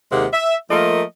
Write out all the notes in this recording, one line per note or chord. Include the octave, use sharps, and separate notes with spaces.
D#2 C3 G#3 A#3 C4 F#5
E5
F3 A3 A#3 F4 A#4 D#5